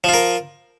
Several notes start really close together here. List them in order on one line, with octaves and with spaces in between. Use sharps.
F3 F4 A#4